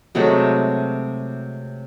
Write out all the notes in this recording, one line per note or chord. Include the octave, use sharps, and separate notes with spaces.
C3 F#3 G#3 A3